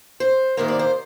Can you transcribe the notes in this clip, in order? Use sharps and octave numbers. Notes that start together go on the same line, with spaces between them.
C5
C3 D#3 A#3 C5
D5
C5